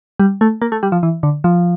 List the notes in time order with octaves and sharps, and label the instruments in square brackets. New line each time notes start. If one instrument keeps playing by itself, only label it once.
[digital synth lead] G3
A3
A#3
A3
G3
F3
E3
D3
F3